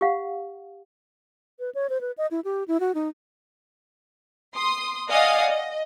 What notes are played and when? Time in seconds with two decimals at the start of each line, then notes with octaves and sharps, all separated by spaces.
0.01 G4 F5 F#5
1.59 B4
1.75 C#5
1.90 C5
2.01 B4
2.18 D#5
2.31 E4
2.44 G4
2.68 E4
2.80 F#4
2.95 D#4
4.54 C6 D#6
5.09 D5 D#5 F5 F#5 G#5 D#6
5.49 D#5